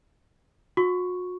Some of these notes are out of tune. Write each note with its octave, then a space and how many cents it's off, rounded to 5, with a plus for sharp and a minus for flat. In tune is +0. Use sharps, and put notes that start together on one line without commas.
F#4 -40 C#6 +0